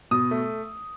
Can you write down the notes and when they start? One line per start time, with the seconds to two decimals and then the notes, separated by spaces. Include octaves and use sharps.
0.11 B2 D#6
0.31 A3